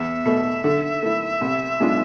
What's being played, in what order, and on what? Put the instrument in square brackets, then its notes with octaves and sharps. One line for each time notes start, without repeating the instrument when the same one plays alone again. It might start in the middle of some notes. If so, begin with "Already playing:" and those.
Already playing: [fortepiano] E2 [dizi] E5
[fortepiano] B2 A3
D3
A3 E4
C2
B2 G#3 D4 F4